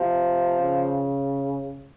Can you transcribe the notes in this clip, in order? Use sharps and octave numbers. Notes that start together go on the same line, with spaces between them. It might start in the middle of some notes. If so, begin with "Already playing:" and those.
Already playing: C3 F3
C#3